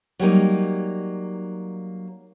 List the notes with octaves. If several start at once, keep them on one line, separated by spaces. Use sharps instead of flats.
F#3 G3 A#3 D#4